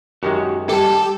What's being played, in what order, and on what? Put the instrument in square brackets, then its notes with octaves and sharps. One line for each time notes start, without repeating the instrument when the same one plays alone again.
[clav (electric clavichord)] F#2 D#3 G#3 [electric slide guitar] F#4 G4
[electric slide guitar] G3 D#5 [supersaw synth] G4 [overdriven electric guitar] A4 A5